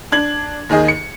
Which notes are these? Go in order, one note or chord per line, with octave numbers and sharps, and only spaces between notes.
D4 G#6 F#7
D#2 D#3 G#4 D#5
C#7